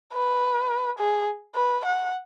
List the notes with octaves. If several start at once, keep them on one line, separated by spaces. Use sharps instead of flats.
B4
G#4
B4
F#5